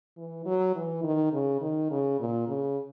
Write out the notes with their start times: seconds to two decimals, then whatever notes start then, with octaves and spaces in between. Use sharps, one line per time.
0.17 E3
0.45 F#3
0.76 E3
1.03 D#3
1.33 C#3
1.61 D#3
1.91 C#3
2.20 A#2
2.48 C#3